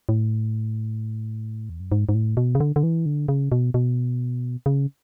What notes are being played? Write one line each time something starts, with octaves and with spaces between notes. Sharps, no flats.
A2
E2
F#2
G#2
G#2
A2
B2
C#3
D3
D3
E3
D3
C#3
B2
B2
C#3